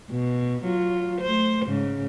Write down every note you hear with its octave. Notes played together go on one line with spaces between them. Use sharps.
B2
F#3 F4
A3 C5
G#2 C#3